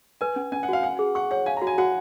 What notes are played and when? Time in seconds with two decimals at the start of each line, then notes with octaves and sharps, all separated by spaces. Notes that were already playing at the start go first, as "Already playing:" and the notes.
0.21 B4 G#5
0.36 C#4
0.52 C#4 G#5
0.63 F#5
0.69 F#4 F5
0.83 F#5 G#5
0.99 G#4
1.15 F#5 C#6
1.31 C#5 F#5
1.46 F5 G#5
1.57 A#5
1.62 F#4
1.67 G#5
1.78 F#4 F#5